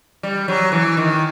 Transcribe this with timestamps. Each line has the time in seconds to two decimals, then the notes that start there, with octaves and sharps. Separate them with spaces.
0.23 G3
0.48 F#3
0.72 E3
0.97 D#3